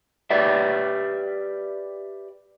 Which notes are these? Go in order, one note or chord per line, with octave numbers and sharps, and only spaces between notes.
G4 B4 D5 E5